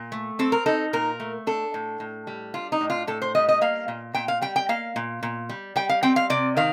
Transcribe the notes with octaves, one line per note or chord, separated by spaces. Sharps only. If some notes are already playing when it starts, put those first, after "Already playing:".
Already playing: A#2
A3
C4 A4
A#4
D#4 A4
A#2 A#4
A3
D4 A4
A2
A2
G3
D4 F4
D#4
A2
F4
A2 A4
C5
G3 D#5
D#5
A#3 F5
A#2
A#2 G5
F5
G3 G5
G5
A#3 F5
A#2
A#2
G3
G3 G5
F5
C4 G5
F5
C3 D5
D#3 F5